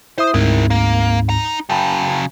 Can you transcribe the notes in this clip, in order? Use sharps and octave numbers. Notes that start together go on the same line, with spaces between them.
E4 C5 E5 D#6
D2 G#2 C4 E4 A#4
A#3
D#4 A#5
C#3 F#3 G5 A5 B5